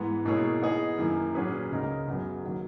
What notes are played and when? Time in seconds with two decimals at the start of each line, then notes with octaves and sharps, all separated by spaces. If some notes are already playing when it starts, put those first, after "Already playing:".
Already playing: G#2 E3 B3
0.25 B2 A#3 E4 G#4 C#5
0.61 E3 B3 D#4 G#4
0.98 F#2 D#3 A#3 E4
1.34 A#2 F#3 C#4 G#4 B4
1.71 C#2 C#3 G#3 D#4 A#4
2.07 F#2 C#3 F#3 B3
2.43 D#3 F#3 A#3